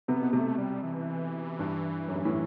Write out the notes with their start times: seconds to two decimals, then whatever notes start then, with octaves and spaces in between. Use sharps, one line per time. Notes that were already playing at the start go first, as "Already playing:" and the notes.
0.08 C3 B3
0.21 B2
0.33 C3 A3
0.58 G3
0.83 E3
1.59 G2
2.08 F#2
2.16 G2
2.25 A2